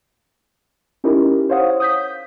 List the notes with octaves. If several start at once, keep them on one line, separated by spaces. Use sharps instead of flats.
C#4 D#4 E4 G4 A#4
C5 C#5 F5 F#5 D#6
D#6 G6 B6